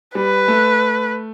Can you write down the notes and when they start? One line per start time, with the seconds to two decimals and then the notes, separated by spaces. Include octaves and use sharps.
0.15 G3 B4
0.48 A3